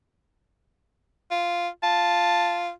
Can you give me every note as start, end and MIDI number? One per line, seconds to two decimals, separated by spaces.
1.31 1.69 65
1.83 2.71 65
1.83 2.62 81